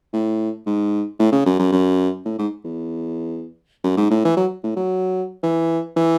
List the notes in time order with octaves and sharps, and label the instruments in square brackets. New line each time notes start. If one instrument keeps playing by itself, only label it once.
[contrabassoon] A2
G#2
A2
C#3
F#2
F#2
F#2
A2
G#2
E2
F#2
G#2
A2
E3
F#3
A2
F#3
E3
E3